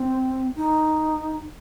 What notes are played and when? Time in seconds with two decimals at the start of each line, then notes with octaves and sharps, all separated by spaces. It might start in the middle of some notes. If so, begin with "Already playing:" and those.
Already playing: C4
0.56 D#4